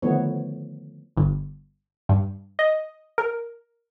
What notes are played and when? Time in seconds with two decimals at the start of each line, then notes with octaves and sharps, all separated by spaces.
0.02 D3 D#3 F3 A3 B3 C#5
1.17 G1
2.09 G2
2.59 D#5
3.18 A#4